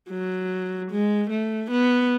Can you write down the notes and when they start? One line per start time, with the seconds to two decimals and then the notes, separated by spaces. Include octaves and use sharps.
0.10 F#3
0.91 G#3
1.30 A3
1.71 B3